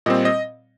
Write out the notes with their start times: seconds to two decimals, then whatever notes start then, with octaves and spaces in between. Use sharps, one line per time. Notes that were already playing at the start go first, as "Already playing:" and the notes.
0.06 A#2 G3 C4 D#5
0.25 D#5